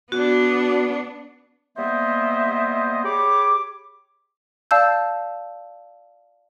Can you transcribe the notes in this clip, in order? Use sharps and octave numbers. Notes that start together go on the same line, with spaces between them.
B3 D4 F#4
G3 A#3 B3 C5 D#5 E5
G4 G#4 C#5 B5 D6
D5 F5 A5 E6 G6